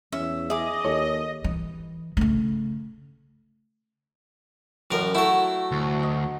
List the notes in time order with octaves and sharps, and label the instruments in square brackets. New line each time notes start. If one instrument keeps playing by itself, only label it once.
[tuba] E2 [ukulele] C#4 [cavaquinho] E5
[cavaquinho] G#4 D6 [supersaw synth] D#5 [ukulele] E5
[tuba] D#2 [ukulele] A4 C#5
[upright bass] E3
C#3 A3
[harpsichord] A1 F#2 A#4
[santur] F#3 A3 [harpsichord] E4 A4
[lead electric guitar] D2
[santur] D#5